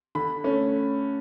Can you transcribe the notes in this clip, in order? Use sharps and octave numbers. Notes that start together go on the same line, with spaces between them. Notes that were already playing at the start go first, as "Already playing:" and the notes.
D3 B5
A3 C#4